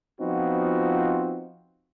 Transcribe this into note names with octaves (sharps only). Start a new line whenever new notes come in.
F3 B3 C4 D#4 F4 F#4